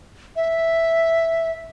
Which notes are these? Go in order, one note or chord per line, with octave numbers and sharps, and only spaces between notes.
E5